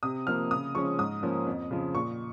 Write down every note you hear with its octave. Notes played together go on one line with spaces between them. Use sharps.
C3 D#6
F3 A#3 F6
C#3 D#6
F3 G#3 C#4 C#6
G#2 D#6
F3 A#3 C#4
F2
C#3 F3
A#2 C#6